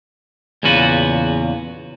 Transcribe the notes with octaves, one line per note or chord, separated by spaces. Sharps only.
E2 A#2 C#3 F4 F#4 B4